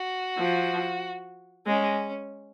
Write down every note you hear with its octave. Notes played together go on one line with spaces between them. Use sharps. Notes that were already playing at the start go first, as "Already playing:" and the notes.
Already playing: F#4
F3
G#3 C#4